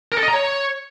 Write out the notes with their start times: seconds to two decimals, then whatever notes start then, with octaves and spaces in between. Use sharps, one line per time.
0.12 A#4
0.17 A4
0.23 D#5
0.28 A#5
0.33 C#5